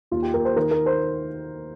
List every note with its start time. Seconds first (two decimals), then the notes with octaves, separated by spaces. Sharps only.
0.11 D#2 F4
0.23 G4
0.34 D#2 A#4
0.45 C5
0.56 D#3 A#4
0.71 A#4
0.86 C5